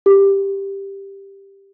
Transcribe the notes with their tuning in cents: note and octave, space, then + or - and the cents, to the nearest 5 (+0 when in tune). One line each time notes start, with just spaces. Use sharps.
G4 +5